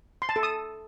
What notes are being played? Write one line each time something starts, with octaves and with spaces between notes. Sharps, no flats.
C6
A5
A4
D#6